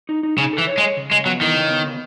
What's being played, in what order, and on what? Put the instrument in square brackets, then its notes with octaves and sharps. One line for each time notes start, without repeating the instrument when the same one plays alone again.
[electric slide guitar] D#4
D#4
[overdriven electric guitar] C#3 [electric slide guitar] D#4
[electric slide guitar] A4
[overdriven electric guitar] E3
[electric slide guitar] C#5
[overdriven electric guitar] G#3
[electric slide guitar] C#5
C#3
[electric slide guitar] C#3 [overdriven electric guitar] G#3
[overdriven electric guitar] F#3 [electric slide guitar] B3
[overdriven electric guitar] D#3 [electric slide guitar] E3
[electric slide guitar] C#3
B3
C#3